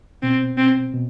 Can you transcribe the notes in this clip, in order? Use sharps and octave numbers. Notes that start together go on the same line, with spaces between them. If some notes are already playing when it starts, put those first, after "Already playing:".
B2 C4
C4
B2